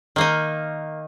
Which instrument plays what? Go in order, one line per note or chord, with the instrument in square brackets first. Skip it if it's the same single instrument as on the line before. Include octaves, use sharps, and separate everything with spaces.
[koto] D#3 A#3 D#4